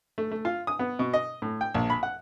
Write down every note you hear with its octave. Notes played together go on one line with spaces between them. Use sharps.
A3
A3
F4
D#6
B3
B2
D#5
A2
G5
A#1
B5
F#5